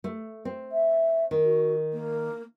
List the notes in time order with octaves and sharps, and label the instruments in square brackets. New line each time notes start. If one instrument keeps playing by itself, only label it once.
[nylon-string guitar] A3
C4
[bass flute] E5
[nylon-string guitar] D#3
[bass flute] F#4
A#3